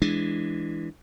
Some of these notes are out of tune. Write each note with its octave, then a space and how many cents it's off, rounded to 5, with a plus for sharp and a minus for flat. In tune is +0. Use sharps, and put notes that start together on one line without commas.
E3 +0 G#3 +0 D4 +0